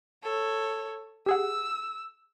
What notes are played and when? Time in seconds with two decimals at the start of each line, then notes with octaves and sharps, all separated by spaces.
0.23 A4 C#5
1.26 G4 G#4 F#5 E6